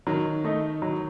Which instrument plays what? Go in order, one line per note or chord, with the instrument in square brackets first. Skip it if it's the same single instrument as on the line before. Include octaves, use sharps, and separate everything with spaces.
[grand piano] D#3 [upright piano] F#3
[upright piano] A3 D#4
F#3